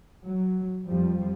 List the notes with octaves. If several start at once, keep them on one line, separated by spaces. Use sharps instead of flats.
F#3
F2 F3 G3